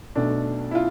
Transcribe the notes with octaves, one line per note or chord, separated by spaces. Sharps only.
B1 B2 A3 D4
E4
F4